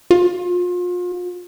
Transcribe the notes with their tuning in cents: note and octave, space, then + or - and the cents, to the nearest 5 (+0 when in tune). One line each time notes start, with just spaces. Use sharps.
F4 +35